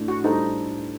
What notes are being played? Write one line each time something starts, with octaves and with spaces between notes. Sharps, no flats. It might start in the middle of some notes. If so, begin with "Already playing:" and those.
Already playing: A2 A3 D4
F#4
A2 G3 D4 D#4 A4 C5